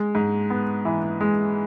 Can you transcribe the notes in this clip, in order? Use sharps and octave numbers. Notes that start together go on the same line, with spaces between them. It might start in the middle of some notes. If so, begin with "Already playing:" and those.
Already playing: G#3
G#2
B3
E3
G#3